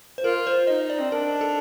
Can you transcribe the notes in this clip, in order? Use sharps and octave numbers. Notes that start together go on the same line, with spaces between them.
C5
F4 A#4
C5
D#4 D#5
D5
C4
D4 A#4
A4